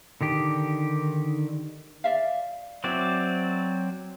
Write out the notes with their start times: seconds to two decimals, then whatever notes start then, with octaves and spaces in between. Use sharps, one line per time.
0.21 D3 D#3 G4
2.04 D5 E5 F5
2.84 F#3 C4 E4 D5 E5